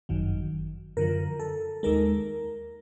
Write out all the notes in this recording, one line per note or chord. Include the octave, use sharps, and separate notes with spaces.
G1 F#2 D#3 F#3
F#2 D3 F3 A#4
A4
D#2 D#3 G#3 A#4